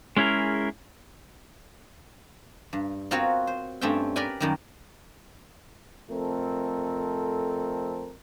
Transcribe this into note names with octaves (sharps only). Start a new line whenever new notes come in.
G#3 C#4 E4 G#4 A#4
G2
B3 C4 F4 F#4 A#4 C#5
C5
G2 A3 C4 C#4 E5 G5
G4 A#4 B4 D5 G5 G#5
F#2 D#3 G3
F2 A3 C4 A4 A#4